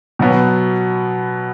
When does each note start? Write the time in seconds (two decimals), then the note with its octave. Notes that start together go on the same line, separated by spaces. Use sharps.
0.19 B2 F#3 B3